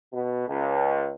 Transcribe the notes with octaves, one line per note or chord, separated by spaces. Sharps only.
B2
C#2